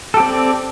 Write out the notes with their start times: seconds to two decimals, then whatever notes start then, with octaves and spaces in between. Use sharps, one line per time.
0.14 A4
0.17 G4
0.20 C4
0.23 D5